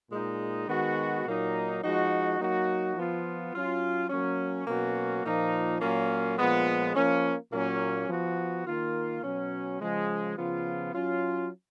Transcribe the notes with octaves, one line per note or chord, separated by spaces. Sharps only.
A#2 G#3 D#4
D#3 G#3 B3 F#4
A#2 F#3 A#3 D#4
F3 G#3 D#4 F#4
F#3 A#3 D#4 F#4
F3 B3 F4
F#3 C#4 F4
F#3 A#3 C#4
B2 F#3 A#3 C#4 F#4
A#2 F3 A#3 D#4
A#2 F#3 A#3 C#4 F4
A#2 F3 G#3 B3
F3 A#3 C#4
A#2 F#3 A#3 C#4
F3 B3 F#4
D#3 A#3 F4
B2 F#3 C#4
C#3 F3 G#3
C#3 F3 B3 F4
F#3 C#4 F4